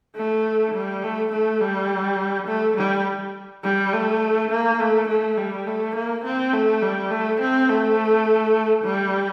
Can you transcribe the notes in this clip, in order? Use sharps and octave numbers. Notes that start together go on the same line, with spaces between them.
A3
G3
A3
A3
G3
A3
G3
G3
A3
A#3
A3
A3
G3
A3
A#3
C4
A3
G3
A3
C4
A3
G3